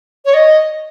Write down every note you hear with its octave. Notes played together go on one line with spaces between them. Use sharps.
C#5
D#5